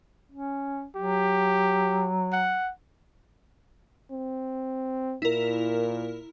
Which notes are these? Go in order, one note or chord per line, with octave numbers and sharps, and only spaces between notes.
C#4
F#3 G4
F#5
C4
A#2 E4 A#4